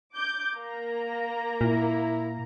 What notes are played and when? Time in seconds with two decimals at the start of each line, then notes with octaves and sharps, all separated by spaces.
0.14 D6 G6
0.57 A#3 A#5
1.61 A#2 E4